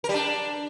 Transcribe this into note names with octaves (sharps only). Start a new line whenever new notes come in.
A#4
G3
D4